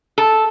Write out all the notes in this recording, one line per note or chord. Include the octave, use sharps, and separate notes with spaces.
A4